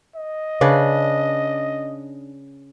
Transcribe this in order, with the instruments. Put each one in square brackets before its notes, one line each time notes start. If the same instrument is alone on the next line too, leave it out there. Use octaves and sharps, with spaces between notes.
[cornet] D#5
[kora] C#3 D4 B4